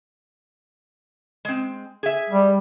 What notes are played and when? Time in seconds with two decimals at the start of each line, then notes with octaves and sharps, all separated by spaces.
1.45 G#3 C4
2.03 G#4 E5
2.30 G3